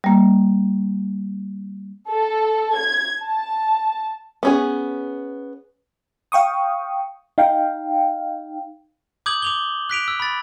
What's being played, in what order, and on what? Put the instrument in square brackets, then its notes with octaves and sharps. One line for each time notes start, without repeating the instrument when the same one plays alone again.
[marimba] G3 A#3
[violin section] A4
G#6
A5
[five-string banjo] B3 C#4 G#4
[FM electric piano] F5 G5 C#6 D#6
D#4 F5 G5
[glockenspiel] D6 D#6 G6 G#6 F#7
D6 F7 G7
F#6 B6 D7 F7
E6
B5 A6